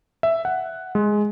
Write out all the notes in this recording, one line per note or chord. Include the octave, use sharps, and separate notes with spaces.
E5
F#5
G#3